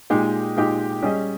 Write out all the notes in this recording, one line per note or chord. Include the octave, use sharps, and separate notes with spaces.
A#2 G#3 D#4 G4
A#2 G#3 D#4 G4
G3 C#4 G#4 D#5